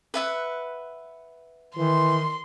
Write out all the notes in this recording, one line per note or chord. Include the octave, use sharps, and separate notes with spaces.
B4 E5 F#5
D#3 E3 C6